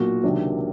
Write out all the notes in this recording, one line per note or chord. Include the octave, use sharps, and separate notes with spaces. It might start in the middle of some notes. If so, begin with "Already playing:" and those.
Already playing: B1 A#2 F#4
C#2 C3 D#3 F#3 D4